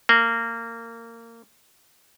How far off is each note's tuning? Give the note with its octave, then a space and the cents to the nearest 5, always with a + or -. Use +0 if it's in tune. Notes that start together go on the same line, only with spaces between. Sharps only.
A#3 -20